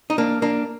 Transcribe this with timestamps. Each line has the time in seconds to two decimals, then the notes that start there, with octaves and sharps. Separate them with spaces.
0.10 D#4
0.18 A#3 D4
0.42 A#3 D4